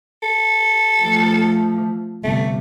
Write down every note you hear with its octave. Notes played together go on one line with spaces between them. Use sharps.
A4
F3 A3
G1 C3 A3